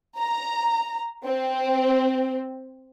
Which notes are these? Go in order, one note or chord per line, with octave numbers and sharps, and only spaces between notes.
A#5
C4